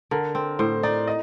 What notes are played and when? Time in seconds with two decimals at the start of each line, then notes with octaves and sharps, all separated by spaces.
0.11 D3 A#4
0.35 C4
0.59 A2 C5
0.83 D#4 D5
1.07 D#5